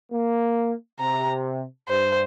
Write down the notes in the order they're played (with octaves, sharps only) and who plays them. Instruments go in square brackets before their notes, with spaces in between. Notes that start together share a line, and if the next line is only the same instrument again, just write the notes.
[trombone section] A#3
[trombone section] C3 [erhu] A#5
[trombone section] G2 [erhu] C5